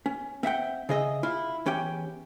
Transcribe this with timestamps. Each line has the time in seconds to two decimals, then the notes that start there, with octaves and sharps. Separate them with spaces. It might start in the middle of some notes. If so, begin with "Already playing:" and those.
0.06 C#4
0.43 C4 E5 F#5 G5
0.89 C#3 G#4 D#5 E5
1.23 E4 F4
1.66 E2 C#4 G4 G5